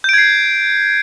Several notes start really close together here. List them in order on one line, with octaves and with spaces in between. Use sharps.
G6 D7 G#6 C7